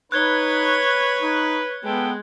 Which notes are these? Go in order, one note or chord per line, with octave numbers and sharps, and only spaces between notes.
D#4 B4 C#5 F#6 G#6 G7
D#4
G#3 B3 A4 B4 G5